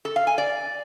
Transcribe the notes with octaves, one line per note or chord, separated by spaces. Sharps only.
A4
F5
G#5
D5